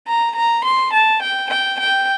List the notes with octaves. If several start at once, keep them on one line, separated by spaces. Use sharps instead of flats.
A#5
A#5
C6
A5
G5
G5
G5